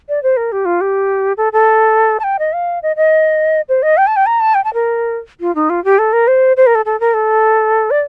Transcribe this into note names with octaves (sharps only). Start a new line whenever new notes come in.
D5
C5
A#4
G4
F4
G4
A4
A4
A5
G5
D#5
F5
D#5
D#5
C5
D#5
G5
A5
G5
A#5
A5
G5
A5
A#4
F4
D#4
F4
G4
A4
A#4
C5
C5
A#4
A4
A4
A#4
A4
D5